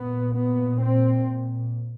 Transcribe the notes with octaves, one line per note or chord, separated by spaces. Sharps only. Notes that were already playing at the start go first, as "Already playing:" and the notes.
Already playing: A#2 B3
B3
C4